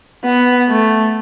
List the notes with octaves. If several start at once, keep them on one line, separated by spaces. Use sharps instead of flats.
B3
A3